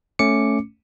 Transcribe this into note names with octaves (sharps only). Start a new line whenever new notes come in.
A3 C#4 D6 C#7